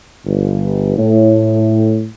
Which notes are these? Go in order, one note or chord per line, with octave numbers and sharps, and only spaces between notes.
G1
A2